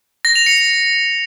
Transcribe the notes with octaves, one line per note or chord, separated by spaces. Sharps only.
A#6
F7
C#7